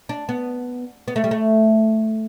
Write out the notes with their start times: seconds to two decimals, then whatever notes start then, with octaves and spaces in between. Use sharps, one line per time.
0.09 D4
0.29 B3
1.08 B3
1.16 A3
1.24 G3
1.31 A3